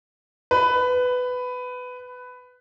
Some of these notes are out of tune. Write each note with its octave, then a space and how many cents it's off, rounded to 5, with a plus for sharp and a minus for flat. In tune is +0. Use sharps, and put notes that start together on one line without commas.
B4 +15